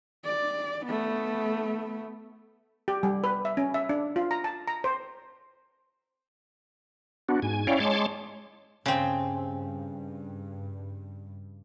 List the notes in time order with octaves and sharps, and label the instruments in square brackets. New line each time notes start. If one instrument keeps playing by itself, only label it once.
[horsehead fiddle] D5
A3 B3
[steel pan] G4
G3
B4
E5
C#4
E5
D4
F4
A#5
A5
A#5
C5
[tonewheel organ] B3 D4 F#4
G#2 G#5
C#4 E4 C#5 D5 F5 G5
G#3 C#5 A5 C6 D6
[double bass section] G2 [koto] C#3 C4